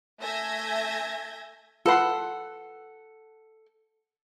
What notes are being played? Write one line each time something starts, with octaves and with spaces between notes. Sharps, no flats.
A3 E5 G#5 G6 G#6 A#6
F4 A4 B4 F#5 C6